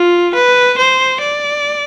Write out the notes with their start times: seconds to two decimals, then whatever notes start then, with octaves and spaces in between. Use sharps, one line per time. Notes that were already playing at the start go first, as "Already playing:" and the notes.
Already playing: F4
0.34 B4
0.78 C5
1.21 D5